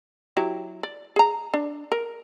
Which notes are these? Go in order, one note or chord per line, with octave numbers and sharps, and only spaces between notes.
F#3 E4 G4
D5
G#4 A#5
D4
A#4